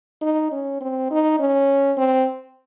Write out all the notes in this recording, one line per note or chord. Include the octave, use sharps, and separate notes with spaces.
D#4
C#4
C4
D#4
C#4
C4